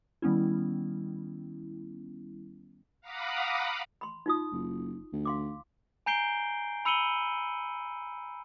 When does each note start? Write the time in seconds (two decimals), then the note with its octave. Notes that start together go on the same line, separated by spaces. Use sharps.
0.22 D#3 G3 B3 C#4 E4
3.01 F5 F#5 A#5 B5 D6 D#6
4.01 B5 C6
4.26 D#4 F4 D#6
4.52 F#1
5.13 D2
5.25 F5 C6 D6
6.06 G#5 A#5 G6 C7 D7 G7
6.85 B5 E6 C#7 D#7 F#7 G7